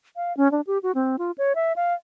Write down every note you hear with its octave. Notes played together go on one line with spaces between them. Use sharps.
F5
C#4
D4
G4
F#4
C4
F4
C#5
E5
F5